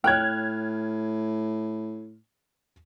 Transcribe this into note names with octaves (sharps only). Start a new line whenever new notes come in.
A2 C#5 G5 F6 F#6 G#6